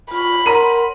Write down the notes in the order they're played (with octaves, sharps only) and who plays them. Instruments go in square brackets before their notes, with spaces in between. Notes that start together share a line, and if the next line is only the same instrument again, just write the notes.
[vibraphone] F4 C#6 [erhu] B5
[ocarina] A#4 [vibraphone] C#5 F#5 C6 [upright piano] A#5 D#7